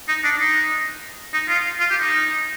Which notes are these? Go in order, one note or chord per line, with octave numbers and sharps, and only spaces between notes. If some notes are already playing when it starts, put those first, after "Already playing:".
D#4
D4
D#4
D#4
F4
F4
G4
D#4